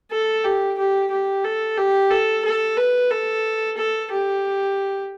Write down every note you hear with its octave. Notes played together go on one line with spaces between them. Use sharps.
A4
G4
G4
G4
A4
G4
A4
A4
B4
A4
A4
G4